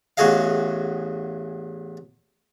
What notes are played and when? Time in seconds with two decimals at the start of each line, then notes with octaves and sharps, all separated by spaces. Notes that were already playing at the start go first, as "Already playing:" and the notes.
0.17 A1 E2 F#4 G#4 D#5 F5